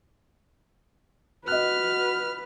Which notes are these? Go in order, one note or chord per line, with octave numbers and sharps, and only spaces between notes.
F#4 B4 D#5 F6 F#6